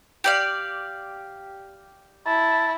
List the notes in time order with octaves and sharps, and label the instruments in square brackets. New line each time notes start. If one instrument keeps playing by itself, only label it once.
[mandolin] G4 D5 F5
[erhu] E4 [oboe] A5